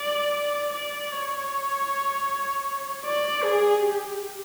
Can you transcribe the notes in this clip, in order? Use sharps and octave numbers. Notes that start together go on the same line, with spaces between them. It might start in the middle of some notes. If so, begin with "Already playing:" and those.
Already playing: D5
D5
C#5
D5
G#4
G4